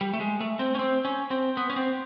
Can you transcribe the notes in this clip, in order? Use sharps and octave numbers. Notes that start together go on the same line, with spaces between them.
G3
A3
G#3
A3
C4
C#4
C4
C#4
C4
B3
C#4
C4